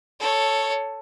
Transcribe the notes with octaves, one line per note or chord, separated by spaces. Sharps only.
A4 C#5